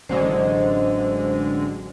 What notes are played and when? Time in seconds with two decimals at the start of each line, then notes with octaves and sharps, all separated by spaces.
0.09 A1 D3 F#3 G#3 C#4 C5 D#5